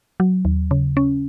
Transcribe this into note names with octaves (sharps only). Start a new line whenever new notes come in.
F#3
D#2
C#3
C#4